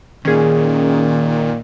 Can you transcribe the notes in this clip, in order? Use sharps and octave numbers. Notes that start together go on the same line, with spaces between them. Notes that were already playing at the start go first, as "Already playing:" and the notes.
A#2 D#3 C#4 G#4